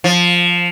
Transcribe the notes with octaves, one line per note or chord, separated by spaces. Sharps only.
F3